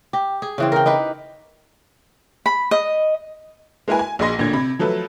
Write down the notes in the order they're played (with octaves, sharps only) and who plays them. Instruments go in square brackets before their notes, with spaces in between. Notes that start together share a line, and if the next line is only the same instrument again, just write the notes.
[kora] G4
G#4
C#3 E3 C4
A#4 G5
D#4 G4 B4
[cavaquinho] B5
D#5
[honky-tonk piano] G#3 A#3 E4 A#4 B4 G#5
G#5
A#1 A#2 G#4 D#5 C6 A#6
A1 A#2 D3 G#6
C3 B5
F3 F#3 A3 A4 B4